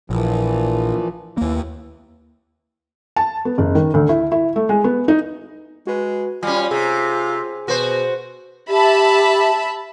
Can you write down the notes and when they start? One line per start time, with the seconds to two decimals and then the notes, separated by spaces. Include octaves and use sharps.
0.10 A#1 A#2 E3 F3
1.38 D#2 E3 A#3
3.16 A5
3.45 B3
3.58 F#1
3.75 D#3
3.94 D2
4.09 E4
4.32 E4
4.56 A3
4.69 G#3
4.84 B3
5.08 D#4
5.87 G#3 F#4 B4
6.43 G3 C#4 F4 G#5
6.71 C3 G#4 G#5
7.68 B2 F#4 C5
8.69 G4 E5 A5 B5